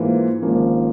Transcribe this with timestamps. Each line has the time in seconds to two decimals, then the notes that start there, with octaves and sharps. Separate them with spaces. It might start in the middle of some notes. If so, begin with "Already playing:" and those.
Already playing: G#2 E3 A#3 F4 C5
0.42 G#1 G#2 F3 A#3 C#4